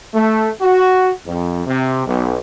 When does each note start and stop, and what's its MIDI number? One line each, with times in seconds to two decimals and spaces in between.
0.13 0.48 57
0.60 1.08 66
1.25 1.62 41
1.66 2.02 48
2.05 2.36 35